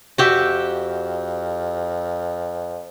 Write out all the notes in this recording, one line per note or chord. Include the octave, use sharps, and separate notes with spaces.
F2 F#4 G4 E5